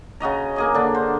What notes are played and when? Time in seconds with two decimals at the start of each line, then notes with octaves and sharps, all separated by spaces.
0.20 C#3 F#4 D#5 A#5
0.56 A#3 G#4 D#5
0.74 D3 D4
0.95 C5